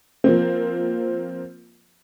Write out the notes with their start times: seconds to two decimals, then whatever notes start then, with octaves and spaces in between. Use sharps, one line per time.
0.24 F3 A#3 C4